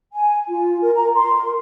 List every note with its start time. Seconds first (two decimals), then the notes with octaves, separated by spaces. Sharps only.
0.13 G#5
0.48 F4
0.81 A#4
0.95 A#5
1.14 C6
1.33 A#4